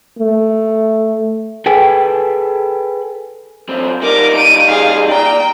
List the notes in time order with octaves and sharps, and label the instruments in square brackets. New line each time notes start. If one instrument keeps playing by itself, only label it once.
[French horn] A3
[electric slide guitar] G#4 A4 B4 G5 G#5
[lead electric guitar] F#2 C4
[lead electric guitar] G3 D#4 [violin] A#4 D6
[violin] D7 D#7
G#4 F5
[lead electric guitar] D5 A#5 [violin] G5